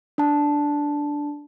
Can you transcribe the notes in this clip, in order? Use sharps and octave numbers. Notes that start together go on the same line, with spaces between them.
D4 A5